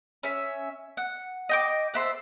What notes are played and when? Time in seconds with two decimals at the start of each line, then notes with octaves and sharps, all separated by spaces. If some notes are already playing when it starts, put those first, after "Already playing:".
0.23 C#4 E5
0.97 F#5
1.49 D#5 G5 D6
1.94 A4 C5 E5 F#5